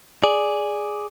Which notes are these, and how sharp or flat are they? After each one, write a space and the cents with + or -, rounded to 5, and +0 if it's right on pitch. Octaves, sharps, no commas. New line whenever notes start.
G#4 +0 D5 +0